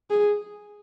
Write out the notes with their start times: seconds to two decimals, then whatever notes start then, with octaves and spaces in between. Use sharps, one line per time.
0.10 G#4